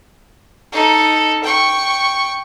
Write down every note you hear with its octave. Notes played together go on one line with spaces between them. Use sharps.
D#4 A4
G5 C#6